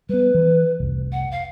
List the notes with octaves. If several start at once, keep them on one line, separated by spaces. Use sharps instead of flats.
G3 B3 B4
E3
F1 C2
F#5
F5